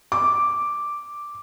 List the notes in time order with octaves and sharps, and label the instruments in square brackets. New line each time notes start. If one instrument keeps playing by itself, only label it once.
[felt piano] D6